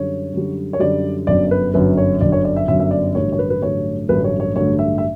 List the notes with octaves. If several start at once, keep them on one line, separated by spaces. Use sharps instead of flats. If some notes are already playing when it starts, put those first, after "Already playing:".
Already playing: F#2 D3 G3 C#5
F#2 D3 G3
C#5
F#2 D3 G3 D5
G1 F#2 D3 F#3 D5
B4
G1 F#2 D3 F#3 B4
C#5
G1 F#2 D3 F#3 D5
C#5
D5
E5
G1 F#2 D3 F#3 E5
E5
D5
A1 G2 D3 F#3 A3 C#5
C#5
B4
B4
A1 G2 D3 F#3 A3 C#5
A1 G2 D3 F#3 A3 B4
C#5
C#5
A1 G2 D3 F#3 A3 C#5
E5
E5